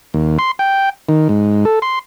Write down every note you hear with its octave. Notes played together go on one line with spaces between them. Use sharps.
D#2
C6
G5
D#3
G#2
A4
C6